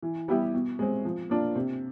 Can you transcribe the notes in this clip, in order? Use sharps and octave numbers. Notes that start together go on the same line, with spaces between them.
E3
G3 B3 E4 G4
B2
G#3 C4
F3
A#3 D4 F4
C3